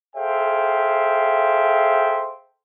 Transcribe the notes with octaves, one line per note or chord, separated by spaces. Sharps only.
G#4 A4 C5 E5 F5 G5